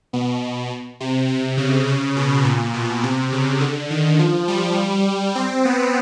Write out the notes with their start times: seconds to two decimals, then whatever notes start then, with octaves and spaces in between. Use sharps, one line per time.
0.13 B2
1.00 C3
1.28 C3
1.57 C#3
1.88 C#3
2.16 B2
2.45 A#2
2.74 B2
3.03 C3
3.32 C#3
3.61 D3
3.90 D#3
4.19 F3
4.48 G3
5.35 C4
5.65 B3